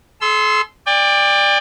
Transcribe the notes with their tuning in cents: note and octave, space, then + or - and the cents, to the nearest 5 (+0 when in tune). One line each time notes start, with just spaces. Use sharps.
A4 -45 C6 -10 E6 +15
D5 +10 G5 +35